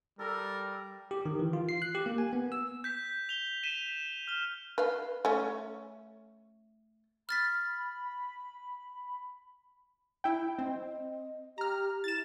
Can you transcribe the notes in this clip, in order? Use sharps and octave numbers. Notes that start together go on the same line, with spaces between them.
G3 A4 A#4 D#5 E5
G4
D#3
E3
F4
C7
F#6
G4
A#3
G#5
B3
E6
G6 B6
F7 G7
B6 D#7 E7
F6 G7
B4 F5
A3 C#4
B5 F6 A6 B6
E4 G5
C4 D#5
G4 A#5 F6
E4 A6 E7